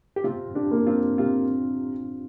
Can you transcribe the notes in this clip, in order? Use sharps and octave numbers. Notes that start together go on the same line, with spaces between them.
G4
C3 C4 F4
D4 G4
A#3
C4 F4
C3 C4 F4